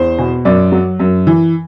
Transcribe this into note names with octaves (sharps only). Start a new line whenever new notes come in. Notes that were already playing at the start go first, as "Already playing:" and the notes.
Already playing: E2 C5
B2
F#2 D5
F#3
F#2
E3